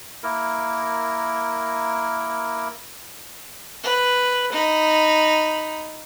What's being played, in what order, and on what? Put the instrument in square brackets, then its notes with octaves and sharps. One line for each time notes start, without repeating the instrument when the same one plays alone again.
[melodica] A#3 E4 A#4
[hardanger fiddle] B4
D#4 B5